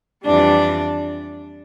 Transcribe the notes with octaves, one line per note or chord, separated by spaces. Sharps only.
F2 E3 G3 D4 D5